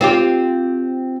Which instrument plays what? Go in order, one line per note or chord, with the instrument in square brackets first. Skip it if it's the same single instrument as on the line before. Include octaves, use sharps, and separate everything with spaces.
[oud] C4 F4 G4